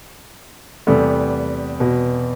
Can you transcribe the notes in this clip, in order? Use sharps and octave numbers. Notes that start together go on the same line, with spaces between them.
E2 C3 G3 A3 B3
B2